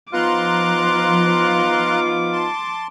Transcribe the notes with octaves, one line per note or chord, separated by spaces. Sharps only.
F3 B3 D#4 F4 A#5 C6 D6 F#6
A5 C6